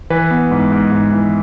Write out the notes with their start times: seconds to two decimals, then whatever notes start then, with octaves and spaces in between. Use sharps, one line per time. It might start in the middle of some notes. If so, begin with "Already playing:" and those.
0.10 E3 B4
0.31 B3
0.51 G#2
0.72 G#2
0.92 G#2
1.13 E3